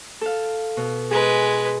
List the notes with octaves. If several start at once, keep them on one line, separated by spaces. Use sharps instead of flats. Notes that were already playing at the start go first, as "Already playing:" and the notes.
A4 F5
B2
G#3 G#4 B4